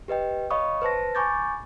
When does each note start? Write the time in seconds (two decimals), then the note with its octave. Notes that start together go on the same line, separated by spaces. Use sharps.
0.08 G4 B4 D#5 G5
0.50 C#5 D#5 F5 B5 C#6 D#6
0.82 B4 C5 A5 A#6
1.15 G#5 B5 C#6 D6 G6 A6